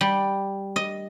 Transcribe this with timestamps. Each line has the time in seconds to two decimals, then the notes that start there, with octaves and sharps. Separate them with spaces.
0.01 G3
0.76 D#5